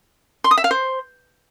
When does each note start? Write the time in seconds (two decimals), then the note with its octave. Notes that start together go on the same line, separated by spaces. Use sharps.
0.44 C6
0.51 D#6
0.58 E5
0.64 F5
0.71 C5